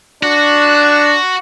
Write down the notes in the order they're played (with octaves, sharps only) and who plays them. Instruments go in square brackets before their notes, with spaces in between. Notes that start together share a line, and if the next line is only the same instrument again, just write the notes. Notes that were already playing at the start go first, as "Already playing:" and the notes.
[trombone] D4 [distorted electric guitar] F#4